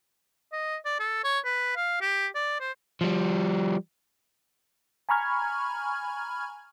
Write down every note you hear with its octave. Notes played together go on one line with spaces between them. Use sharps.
D#5
D5
A4
C#5
B4
F5
G4
D5
C5
F3 G3
G#5 A#5 B5 C#6 F6 G#6